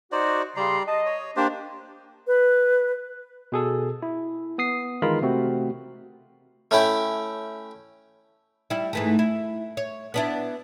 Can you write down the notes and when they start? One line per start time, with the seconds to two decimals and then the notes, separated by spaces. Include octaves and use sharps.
0.12 D#4 F#4 C5 D5
0.57 C#3 G3 D5 A#5 C6
0.88 D#5 A5
1.06 C#5
1.36 A#3 D4 G4 C5
2.27 B4
3.52 B2 G#4 A4
4.03 E4
4.58 B3 D#6 C7
5.02 D#3 E3 G#3 F4 A#4 B5
5.22 C3 A3 C4 F#4
6.71 A3 C#4 E4 G5
8.70 G3 E4
8.93 G#2 E3 A3
9.19 E4
9.77 C#5
10.14 B3 D4 E4